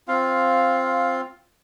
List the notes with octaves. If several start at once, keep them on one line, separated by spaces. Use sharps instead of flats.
C4 F4 F5